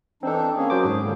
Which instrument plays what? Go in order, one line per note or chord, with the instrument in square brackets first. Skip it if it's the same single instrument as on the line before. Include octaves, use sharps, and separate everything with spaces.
[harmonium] E3 D4 D#4 [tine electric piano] C4 A4
[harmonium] A#3 C#4 G#4
[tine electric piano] F#3 C5 D6
G#2 D#3
[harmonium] D3 F3 G3